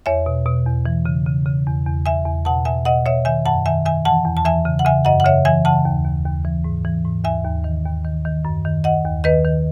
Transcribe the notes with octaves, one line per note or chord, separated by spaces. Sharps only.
E2 C#5 E5
B2
B2
E2
E3
C#3
C#3
C#3
E2
E2
E2 E5 G#5
E2
B2 F#5 A5
B2 E5 G#5
B2 D#5 F#5
B2 C#5 E5
D#3 E5 G#5
F#2 F#5 A5
D#3 E5 G#5
D#3 E5 G#5
E3 F#5 A5
E2
A5
E3 E5 G#5
C#3
F#5
C#3 E5 G#5
F#2 D#5 F#5
F#5
C#3 C#5 E5
E3 E5 G#5
C#3 F#5 A5
D#2
D#2
D#2
E3
G#2
E3
G#2
D#2 E5 G#5
D#2
D#3
D#2
D#3
D#3
F#2
D#3
D#3 D#5 F#5
D#2
D#3 B4 D#5
D#3